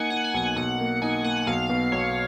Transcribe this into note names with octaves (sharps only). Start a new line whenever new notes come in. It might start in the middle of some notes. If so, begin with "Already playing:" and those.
Already playing: A#3 D#4 F#5 G#5
D#4 F#5
G#5
B1 F#5
B1 F#5
A#3
D#4 G#5
A#3 F#5
B1 F5
B2
B1 C#5